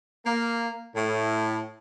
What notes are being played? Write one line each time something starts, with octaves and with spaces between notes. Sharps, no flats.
A#3
A2